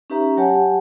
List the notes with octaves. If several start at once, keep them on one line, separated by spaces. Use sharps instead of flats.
C#4 D#4 G4 B4 E5 A#5
F#3 G4 C#5 F#5 G#5 A5